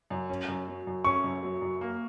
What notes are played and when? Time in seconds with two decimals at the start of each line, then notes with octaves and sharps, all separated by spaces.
0.10 F#2
0.29 C#4
0.48 F#2
0.68 F#3
0.87 F#2
1.04 C#4 C#6
1.24 F#2
1.43 F#3
1.62 F#2
1.81 A#3